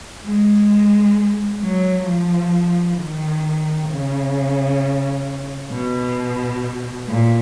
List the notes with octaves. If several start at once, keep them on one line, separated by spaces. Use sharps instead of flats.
G#3
F#3
F3
D#3
C#3
B2
A#2